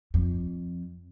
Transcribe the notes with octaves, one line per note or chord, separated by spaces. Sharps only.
F2